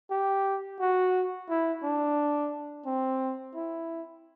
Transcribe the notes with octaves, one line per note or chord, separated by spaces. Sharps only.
G4
F#4
E4
D4
C4
E4